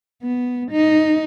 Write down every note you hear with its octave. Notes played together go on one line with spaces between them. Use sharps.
B3
D#4